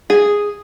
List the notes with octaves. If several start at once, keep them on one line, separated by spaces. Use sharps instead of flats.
G#4